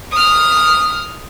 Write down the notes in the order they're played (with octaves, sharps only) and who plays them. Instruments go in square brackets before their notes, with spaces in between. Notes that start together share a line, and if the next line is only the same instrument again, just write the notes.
[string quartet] D#6 F6